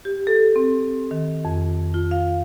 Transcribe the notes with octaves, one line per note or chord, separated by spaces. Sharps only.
G4
A4
C4
D#3
F2
F4
F5